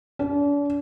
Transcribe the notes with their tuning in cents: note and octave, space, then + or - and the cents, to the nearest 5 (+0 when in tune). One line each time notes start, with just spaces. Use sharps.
D4 -40